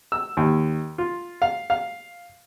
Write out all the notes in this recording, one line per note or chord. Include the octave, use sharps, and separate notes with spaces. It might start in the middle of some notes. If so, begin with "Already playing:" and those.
E6
D#2
F4
F5
F5